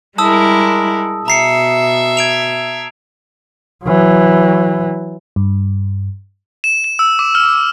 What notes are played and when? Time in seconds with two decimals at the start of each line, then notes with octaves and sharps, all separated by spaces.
0.18 G3 G#3 E4 A#4 A5 D#6 E6
1.28 B2 E5 A#5 C7 C#7
2.17 G#6 D7 F7
3.84 E3 F#3
5.36 G2
6.64 E7
6.84 E7
6.99 E6
7.19 D6
7.35 F6